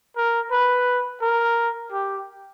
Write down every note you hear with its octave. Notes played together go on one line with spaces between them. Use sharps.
A#4
B4
A#4
G4